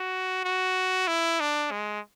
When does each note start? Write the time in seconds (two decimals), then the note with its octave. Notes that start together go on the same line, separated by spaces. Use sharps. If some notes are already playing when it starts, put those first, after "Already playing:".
Already playing: F#4
0.44 F#4
1.08 E4
1.40 D4
1.71 G#3